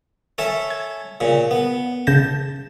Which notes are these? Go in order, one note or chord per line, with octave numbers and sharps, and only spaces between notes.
C#4 A4 E5
G#6
A#2 C#3
B3
C#3 A5 G6 A#6